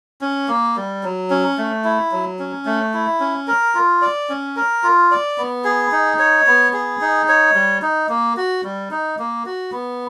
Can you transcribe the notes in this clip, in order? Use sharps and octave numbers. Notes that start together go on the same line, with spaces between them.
C#4
A#3
G3
F#3
C#4
A3
E4
F#3
C#4
A3
E4
C#4
A#4
F4
D5
C#4
A#4
F4
D5
B3
G#4
D#4
C#5
B3
G#4
D#4
C#5
G3
D#4
A#3
F#4
G3
D#4
A#3
F#4
B3